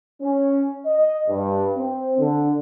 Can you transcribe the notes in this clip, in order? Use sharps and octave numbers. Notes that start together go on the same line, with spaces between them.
C#4
D#5
G2
C4
D3